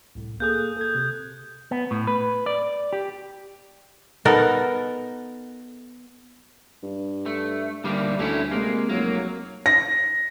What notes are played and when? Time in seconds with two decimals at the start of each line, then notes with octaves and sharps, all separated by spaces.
0.15 C2 A2
0.40 A#3 G#4 A4 D#6 F#6 G6
0.77 A4 G#6
0.95 C3
1.71 B3
1.91 A2
2.07 B4
2.46 D5
2.93 G4
4.25 B3 D#4 A4 A#4
6.83 G2
7.26 A3
7.84 D2 G3 A#3
8.19 D2 A3 C#4 E4
8.51 C3 G#3 A#3
8.89 F1 F#3 A#3
9.66 A#6